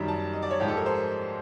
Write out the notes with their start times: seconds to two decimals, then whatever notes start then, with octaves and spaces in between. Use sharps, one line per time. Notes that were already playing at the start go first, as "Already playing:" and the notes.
Already playing: F#2 D#3 G3 A#5
0.08 A5
0.33 D#5
0.42 D5
0.51 C#5
0.60 G#2 F3 G#3 G4
0.68 A4
0.77 A#4
0.86 C5